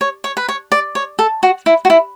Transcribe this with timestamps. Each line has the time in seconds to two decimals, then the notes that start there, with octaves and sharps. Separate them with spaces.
0.01 C#5
0.24 C#5
0.37 B4
0.48 C#5
0.72 D5
0.95 C#5
1.19 A4
1.43 F#4
1.66 E4
1.85 F#4
1.90 E4